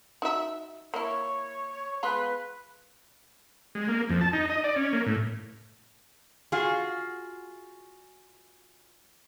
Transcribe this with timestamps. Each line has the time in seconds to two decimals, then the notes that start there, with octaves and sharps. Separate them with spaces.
0.22 D#4 F#4 E5
0.94 A#3 E4 C#5
2.03 G#3 B3 F4 B4
3.75 G#3
3.89 A#3
4.10 F2
4.21 A5
4.33 D#4
4.50 D#5
4.64 D5
4.76 C#4
4.93 A#3
5.06 A2
6.52 F4 F#4 G#4